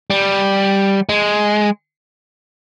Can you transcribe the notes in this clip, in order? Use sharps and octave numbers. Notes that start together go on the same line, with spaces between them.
G3
G#3